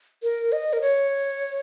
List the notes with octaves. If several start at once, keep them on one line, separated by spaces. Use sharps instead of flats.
A#4
D#5
A#4
C#5